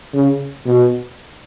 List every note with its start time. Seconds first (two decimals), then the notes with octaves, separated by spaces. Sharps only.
0.14 C#3
0.66 B2